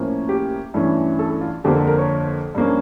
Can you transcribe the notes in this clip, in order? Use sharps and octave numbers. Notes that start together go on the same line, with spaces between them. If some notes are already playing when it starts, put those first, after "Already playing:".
Already playing: A2 F3 A#3 C#4
G4
G2 E3 A3 C#4
A4
F4
F2 D3 F3 A#3 G4
A4
A#4
C#5
G2 F3 A#3 C#4